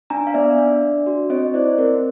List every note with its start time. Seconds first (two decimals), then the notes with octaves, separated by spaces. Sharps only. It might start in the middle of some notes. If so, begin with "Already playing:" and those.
0.10 D4 G#5 A#5
0.27 F5
0.34 B3 D5 E5
0.58 D4
0.82 D4
1.07 F#4
1.30 C4 C#5 D#5
1.54 E4 C5 D5
1.78 C4 A#4